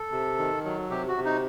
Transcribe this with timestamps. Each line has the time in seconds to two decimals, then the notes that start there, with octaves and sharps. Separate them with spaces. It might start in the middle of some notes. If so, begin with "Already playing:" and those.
Already playing: A4
0.12 C3
0.38 D#3
0.65 F#3
0.90 C3 G4
1.08 F#4
1.17 C3
1.25 D#4